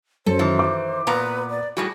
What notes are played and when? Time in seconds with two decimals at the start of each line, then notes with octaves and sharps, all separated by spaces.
0.26 F#2 A4 C5
0.39 D#3 E3
0.59 D6
1.07 A#2 B3 B4 A#5
1.50 D5
1.77 A2 G3 F#4 G#4